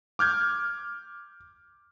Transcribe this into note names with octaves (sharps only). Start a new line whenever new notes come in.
D6 F6 G6 G#6